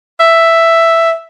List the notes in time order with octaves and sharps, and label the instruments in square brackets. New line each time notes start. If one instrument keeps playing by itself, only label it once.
[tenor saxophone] E5